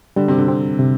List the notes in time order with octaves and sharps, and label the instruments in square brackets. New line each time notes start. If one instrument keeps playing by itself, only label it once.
[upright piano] D3 [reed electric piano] G3
[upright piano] C3
D3
[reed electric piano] C4
C3